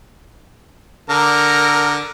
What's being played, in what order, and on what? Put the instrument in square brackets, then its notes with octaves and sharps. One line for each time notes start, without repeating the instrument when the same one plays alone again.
[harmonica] D3 A#5 [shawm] A#4